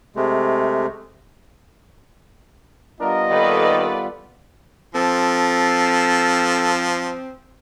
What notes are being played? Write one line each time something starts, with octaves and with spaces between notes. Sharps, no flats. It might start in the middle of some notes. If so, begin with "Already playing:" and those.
C3 G#3 A3
G3 B3 D4 F4 A#4 D#5
D#2 D#3 A4 B4 D5
F3 C4 A4